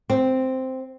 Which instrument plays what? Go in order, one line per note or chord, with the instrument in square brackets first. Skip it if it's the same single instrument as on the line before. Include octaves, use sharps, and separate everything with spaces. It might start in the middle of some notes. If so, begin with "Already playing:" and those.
[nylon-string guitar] C4